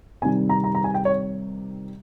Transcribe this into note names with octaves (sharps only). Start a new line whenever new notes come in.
C3 D#3 G3 G#5
A#5
A#5
A#5
G#5
G5
C#5